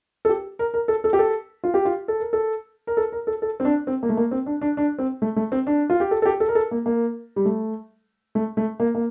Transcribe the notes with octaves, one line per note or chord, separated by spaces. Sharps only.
A4
G4
A#4
A#4
A4
A4
G4
A4
F4
G4
F4
A4
A#4
A4
A#4
A4
A#4
A4
A4
C4
D4
C4
A#3
A3
A#3
C4
D4
D4
D4
C4
A3
A3
C4
D4
F4
G4
A4
A4
G4
A4
A#4
A4
A#3
A#3
G3
A3
A3
A3
A#3
A#3